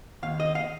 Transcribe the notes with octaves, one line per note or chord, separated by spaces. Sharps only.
D#2 F5
D#5
F5